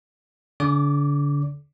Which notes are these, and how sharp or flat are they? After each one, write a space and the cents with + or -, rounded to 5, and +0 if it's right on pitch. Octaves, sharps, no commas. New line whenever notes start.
D3 -35 D5 -35 D6 +5